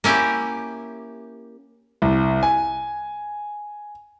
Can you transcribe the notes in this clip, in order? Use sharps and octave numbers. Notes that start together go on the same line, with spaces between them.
A#3 C#4 E4 G4
C2
G#5